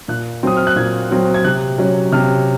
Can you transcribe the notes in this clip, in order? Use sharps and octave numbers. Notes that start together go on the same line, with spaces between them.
A#2 F#6
F#3 C4 D#6
F6
F#6
A#2 G#6
F#3 C4
G#6
C3 F#6
F#3 C#4
C3 F6